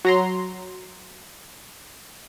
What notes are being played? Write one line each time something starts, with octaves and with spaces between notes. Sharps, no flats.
F#3 A#5 C6